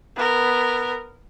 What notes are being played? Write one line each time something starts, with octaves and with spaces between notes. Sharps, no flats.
B3 A#4